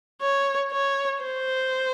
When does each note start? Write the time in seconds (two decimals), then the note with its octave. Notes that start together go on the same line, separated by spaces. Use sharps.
0.21 C#5
0.72 C#5
1.23 C5